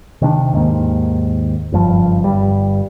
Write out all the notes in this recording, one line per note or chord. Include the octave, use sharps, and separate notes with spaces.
C3 D#3 C#4 D4
D#2 G#2 D#3 A#3
F#1 G2 F3
G1 C#2 G2 G3